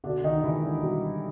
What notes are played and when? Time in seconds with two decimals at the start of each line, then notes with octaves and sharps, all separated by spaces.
0.04 B2 D3 D4
0.24 D#3 D#4
0.43 E3 G#3 E4
0.63 D3 D4
0.83 B2 G3 G4